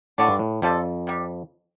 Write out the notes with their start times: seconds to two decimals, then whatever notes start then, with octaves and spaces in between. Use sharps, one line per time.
0.18 A2 D3 A3 D4
0.28 G2
0.39 A2
0.62 F2 C3 G3 F4 A4
1.07 C3 G3